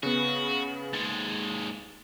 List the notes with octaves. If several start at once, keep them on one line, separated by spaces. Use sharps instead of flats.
C#3 B3 F#4
D#2 G#3 A6